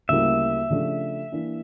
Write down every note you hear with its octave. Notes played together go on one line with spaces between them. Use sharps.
D2 C#3 G3 A#3 E4 E5
C#3 F3 A3 D4 G4
E3 A#3 D4